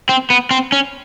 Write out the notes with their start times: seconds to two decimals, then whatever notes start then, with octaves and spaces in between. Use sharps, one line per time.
0.09 C4
0.30 B3
0.51 C4
0.72 C#4